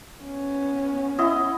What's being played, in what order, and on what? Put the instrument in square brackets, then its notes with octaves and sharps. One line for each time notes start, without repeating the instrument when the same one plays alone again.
[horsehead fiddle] B3 C#4
[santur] E4 D#5 F#5